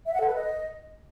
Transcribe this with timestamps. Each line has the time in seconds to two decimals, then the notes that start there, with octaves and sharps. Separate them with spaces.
0.06 E5
0.13 F#5
0.21 A4
0.28 B4
0.35 D#5